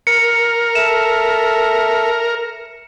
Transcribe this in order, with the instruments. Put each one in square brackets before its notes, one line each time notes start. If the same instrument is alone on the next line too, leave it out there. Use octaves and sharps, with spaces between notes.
[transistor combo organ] A#4 [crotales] C#7
[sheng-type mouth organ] A4 E5 [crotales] E7